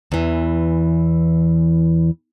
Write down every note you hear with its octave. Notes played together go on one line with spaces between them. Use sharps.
E2 E3